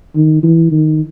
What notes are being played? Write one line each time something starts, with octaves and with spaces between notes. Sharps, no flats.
D#3
E3
D#3